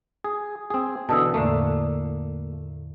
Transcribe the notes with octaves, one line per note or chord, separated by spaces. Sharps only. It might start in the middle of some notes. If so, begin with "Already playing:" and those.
G#4
C4 G#4
B2 D3 E3 A5 D#6 E6
E2 A2 D3 A3 A#3